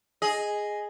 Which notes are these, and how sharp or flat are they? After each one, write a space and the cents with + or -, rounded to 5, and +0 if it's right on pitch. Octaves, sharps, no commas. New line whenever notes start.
G#4 +0 D#5 +0